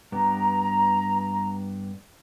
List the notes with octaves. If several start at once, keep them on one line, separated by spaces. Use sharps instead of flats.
G2 B3 G4 A#5